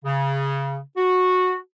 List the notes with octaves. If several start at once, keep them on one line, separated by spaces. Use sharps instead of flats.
C#3
F#4